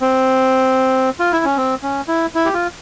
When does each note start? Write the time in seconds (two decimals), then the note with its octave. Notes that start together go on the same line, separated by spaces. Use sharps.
0.01 C4
1.19 F4
1.32 E4
1.44 C#4
1.57 C4
1.83 C#4
2.08 E4
2.35 E4
2.45 G4
2.54 F4